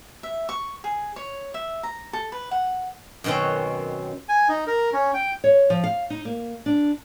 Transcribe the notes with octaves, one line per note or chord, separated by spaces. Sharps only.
E5
C#6
G#4
C#5
E5
A#5
A4
B4
F#5
F#2 B2 D#3 C4 C#4
G#5
D#4
A#4
C#4
G5
C#5
F3
F5
D#4
A#3
D4